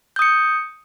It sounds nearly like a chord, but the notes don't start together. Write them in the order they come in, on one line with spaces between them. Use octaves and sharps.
G6 D#6 C#7